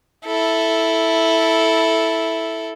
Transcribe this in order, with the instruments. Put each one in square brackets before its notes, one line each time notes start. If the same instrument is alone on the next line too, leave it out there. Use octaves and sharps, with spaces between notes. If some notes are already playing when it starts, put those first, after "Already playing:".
[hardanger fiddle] E4 A4